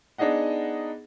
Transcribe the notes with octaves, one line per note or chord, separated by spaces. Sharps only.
B3 D4 D#4 G#4 D#5 F#5